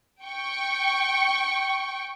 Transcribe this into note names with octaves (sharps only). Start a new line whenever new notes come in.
G5 C#6